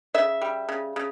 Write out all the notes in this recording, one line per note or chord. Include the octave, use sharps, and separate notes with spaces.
C#3 E5
G3
C#3
C#3